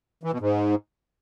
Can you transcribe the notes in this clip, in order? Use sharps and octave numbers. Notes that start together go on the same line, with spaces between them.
E3
B2
G#2